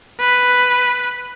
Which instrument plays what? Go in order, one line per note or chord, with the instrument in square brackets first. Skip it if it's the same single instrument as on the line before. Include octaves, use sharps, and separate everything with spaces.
[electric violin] B4